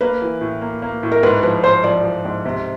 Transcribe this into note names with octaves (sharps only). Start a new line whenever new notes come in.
A#3 B4
E3
A2
A#3
A#3
A2
A#4
G#2 B4
F3 B4
G#2 C5
F3 D5
F3
G#2
C3